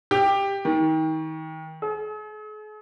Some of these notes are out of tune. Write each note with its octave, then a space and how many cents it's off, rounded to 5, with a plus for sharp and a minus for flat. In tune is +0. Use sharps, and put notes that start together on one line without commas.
G4 +10
D#3 +30
G#4 +45